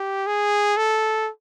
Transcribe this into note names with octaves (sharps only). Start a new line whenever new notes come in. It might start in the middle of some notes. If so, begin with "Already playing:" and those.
Already playing: G4
G#4
A4